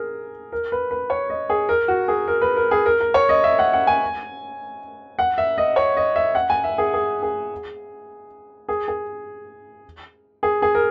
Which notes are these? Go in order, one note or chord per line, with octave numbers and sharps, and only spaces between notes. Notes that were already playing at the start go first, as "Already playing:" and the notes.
Already playing: G#4 A#4
A#4
B4
B4
C#5
D#5
G#4
A#4
F#4
G#4
A#4
B4
A#4
G#4
A#4
A#4
C#5
D#5
E5
F#5
F#5
G#5
F#5
E5
D#5
C#5
D#5
E5
F#5
G#5
E5
G#4
G#4
G#4
G#4
G#4
G#4
G#4
A#4